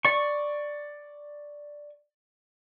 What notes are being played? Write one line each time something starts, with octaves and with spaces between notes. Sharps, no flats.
D5 C#6